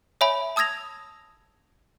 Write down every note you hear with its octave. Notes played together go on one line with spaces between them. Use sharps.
C#5 E5 G#5 B5
A5 D#6 E6 G#6 A#6 F7